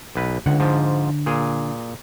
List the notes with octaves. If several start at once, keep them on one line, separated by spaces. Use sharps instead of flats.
B1 B4
C#2 D3 F#5
G#2 F3
A#2 G#4